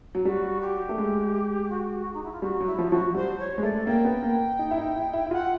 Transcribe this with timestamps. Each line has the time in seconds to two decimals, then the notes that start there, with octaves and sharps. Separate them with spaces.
0.15 F#3
0.25 G3 F#4
0.61 G4
0.89 A3
0.98 G#3
1.69 F#4
2.13 D#4
2.23 E4
2.32 F4
2.42 G3 F#4
2.60 F#3
2.66 E4
2.78 F3
2.90 F3 F#4
2.96 F#3
3.15 G3 C5
3.39 C#5
3.58 G#3
3.63 A3 D5
3.87 A#3 G5
4.05 B3
4.22 A#3
4.59 D#4
4.71 E4
4.77 D#4
4.95 E4
5.13 E4
5.26 E4
5.31 F4 F#5